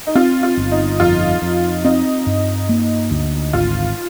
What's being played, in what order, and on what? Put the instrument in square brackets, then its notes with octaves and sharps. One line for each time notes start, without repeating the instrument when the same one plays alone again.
[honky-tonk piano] D#4
[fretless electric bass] C4 [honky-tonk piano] F4
[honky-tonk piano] F4
[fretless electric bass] G1
[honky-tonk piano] D#4
[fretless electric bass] F2 [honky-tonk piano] F4
[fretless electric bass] F2
[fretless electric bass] C4 [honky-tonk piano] D#4
[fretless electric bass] G2
A#3
D2
[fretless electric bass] G#1 [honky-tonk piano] F4